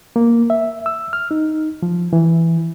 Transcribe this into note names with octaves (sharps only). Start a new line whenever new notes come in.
A#3
E5
E6
F6
D#4
F3
E3